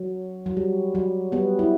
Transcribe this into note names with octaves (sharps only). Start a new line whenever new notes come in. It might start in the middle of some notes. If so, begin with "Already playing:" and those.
Already playing: F#3
F#3
G3
F#3
G3 B3
E4